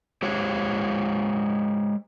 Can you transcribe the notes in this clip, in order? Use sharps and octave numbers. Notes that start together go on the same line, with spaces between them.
G#3 G4 C5 C#5